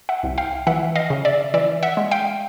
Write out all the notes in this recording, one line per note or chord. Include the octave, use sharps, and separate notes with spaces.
E5 F#5
C2
F5 G5
E3 E5 F#5
D#5 F5
C#3
D5 E5
E3 D5 E5
E5 F#5
G#3
F5 G5